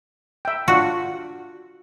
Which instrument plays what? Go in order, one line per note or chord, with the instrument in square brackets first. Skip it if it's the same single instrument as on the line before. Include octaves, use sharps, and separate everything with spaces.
[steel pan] E5 G5
[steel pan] D4 F4 F#5 [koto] F#4